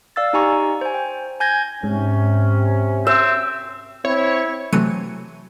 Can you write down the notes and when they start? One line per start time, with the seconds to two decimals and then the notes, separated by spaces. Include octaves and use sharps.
0.16 D5 F5 E6 A6
0.33 D#4 G4 G#5 A#5 C#6
0.81 C5 G#5
0.94 G5
1.40 G#5 G6 G#6 A#6
1.84 G#2 C3 C#4
3.07 C4 E5
4.05 C4 E4 C#5
4.73 C3 E3 F#3 A3 C#7 D#7